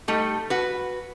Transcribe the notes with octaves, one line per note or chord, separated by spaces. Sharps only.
G3 A3 D#4
F#4 B4